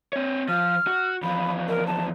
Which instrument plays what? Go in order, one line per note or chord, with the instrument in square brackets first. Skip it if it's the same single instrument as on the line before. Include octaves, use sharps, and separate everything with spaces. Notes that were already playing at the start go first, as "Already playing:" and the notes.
[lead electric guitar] C4 C#5
[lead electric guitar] F3 [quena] F6
[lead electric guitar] F#4
[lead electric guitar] E2 F3 [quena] B5
[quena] A#4
A5